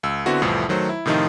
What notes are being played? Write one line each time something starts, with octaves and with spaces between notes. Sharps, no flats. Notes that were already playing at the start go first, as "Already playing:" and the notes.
C#2 E6
D3 B3 C4 E4 F#4
C2 F2 A2 E3 F3
D#3 F#3 A3 C5
E4
A2 C3 D#3 F3 D#4 F4